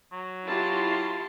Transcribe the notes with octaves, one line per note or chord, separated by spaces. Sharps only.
F#3
E4 F4 G4 A5 C6 C7